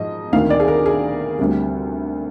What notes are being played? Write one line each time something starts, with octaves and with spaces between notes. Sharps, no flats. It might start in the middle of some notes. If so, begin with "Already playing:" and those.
Already playing: G#2 F3 D#5
D2 C3 D#3 A#3 F5
D5
G#4
A#4
G#4
D2 C3 G3